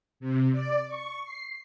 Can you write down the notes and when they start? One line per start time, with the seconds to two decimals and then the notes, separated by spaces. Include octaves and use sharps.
0.20 C3
0.52 D5
0.88 C#6
1.25 C7